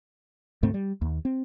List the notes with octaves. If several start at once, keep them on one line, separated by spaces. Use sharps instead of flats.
D2 G#2 A3 C4
G3
D#2
C4